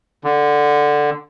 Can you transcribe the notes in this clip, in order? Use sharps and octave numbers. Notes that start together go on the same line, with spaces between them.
D3